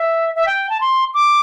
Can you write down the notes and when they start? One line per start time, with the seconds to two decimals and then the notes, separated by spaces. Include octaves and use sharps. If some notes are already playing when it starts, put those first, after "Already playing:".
Already playing: E5
0.35 E5
0.46 G5
0.70 A5
0.81 C6
1.14 D6